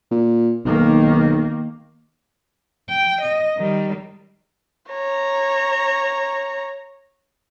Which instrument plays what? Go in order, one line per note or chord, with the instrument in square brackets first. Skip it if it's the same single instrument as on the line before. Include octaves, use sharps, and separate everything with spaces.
[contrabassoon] A#2
[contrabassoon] B1 [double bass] D#3 A#3
[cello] G5
D#5
D#3 G3
[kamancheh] C#5 A#5